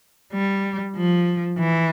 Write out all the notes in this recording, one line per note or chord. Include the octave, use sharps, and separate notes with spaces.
G3
F3
E3